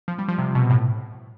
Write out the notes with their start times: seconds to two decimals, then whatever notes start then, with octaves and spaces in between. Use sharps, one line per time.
0.08 F3
0.19 G3
0.28 F3
0.38 C3
0.55 B2
0.70 A2